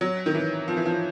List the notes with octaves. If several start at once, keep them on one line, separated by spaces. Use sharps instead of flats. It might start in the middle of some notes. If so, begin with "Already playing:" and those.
F#3
D#3
E3
F3
E3
F3